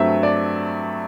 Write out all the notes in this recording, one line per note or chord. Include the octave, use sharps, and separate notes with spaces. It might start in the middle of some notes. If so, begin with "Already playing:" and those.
Already playing: G2 F#3 A3 C4 E5
D5